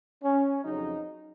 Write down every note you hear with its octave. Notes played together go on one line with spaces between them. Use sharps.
C#4
F2 C#3 F#3 D#4